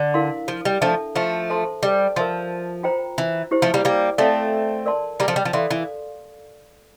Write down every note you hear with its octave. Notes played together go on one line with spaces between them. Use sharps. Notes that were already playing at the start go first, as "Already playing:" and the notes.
Already playing: D3
E4 A#4 F5 C6
F3
G3
F3 A3 D4 A4 E5 A5
F3 A3
A4 C5 E5 A5 C6
G3
F3 A#4 E5 A5 C6
F4 C5 G5 A#5
E3
E4 G4 C5
F3 A3
G3 A#3
G3 A#3
A3 C4 A4 D5 F5 A5
A#4 D5 A5 C6
G3 A#3
F3 A3
G3
F3
E3 A4 D5 F5 C6
E3